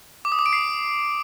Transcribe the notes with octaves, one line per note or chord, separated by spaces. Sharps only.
D6
D#6
D6
D7
C7